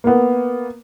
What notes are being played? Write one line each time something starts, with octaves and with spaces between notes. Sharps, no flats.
A#3 B3